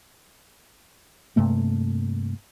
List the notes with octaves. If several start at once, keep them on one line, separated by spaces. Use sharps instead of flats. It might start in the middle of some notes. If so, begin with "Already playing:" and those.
G2 C3 A3 A#3